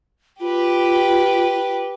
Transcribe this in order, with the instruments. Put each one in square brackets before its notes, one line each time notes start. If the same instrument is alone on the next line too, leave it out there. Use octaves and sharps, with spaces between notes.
[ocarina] F4 [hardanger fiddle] G4 B4